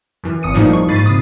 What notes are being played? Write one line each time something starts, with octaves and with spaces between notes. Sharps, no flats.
F#2 E3
G#1 D#6 C#7 D#7
A2 F3 G3 A#3 D#4
C#6
G#2 B5 A6 C7 D#7
C3 D#6